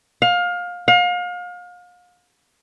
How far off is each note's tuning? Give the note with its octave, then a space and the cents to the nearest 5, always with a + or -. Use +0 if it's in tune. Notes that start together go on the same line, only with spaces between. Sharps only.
F5 +25
F5 +35